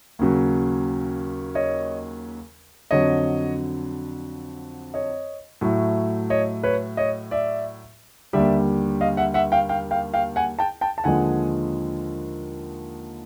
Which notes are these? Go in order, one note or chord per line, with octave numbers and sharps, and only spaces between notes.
D#2 C#3 F#3
C#5 D#5
F2 D3 F#3 C#5 D#5
C#5 D#5
A2 F#3 A3
C#5 D#5
B4 C#5
C#5 D#5
D5 E5
D#2 D3 G3 D5 E5
D#5 F5
E5 F#5
E5 F#5
F5 G5
F5 G5
F5 G5
F5 G5
F#5 G#5
G5 A5
G5 A5
A5
D#2 D3 F3 G#3 F#5 G#5